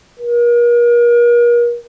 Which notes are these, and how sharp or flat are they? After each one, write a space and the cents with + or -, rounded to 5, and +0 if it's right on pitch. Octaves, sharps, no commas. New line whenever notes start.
A#4 +40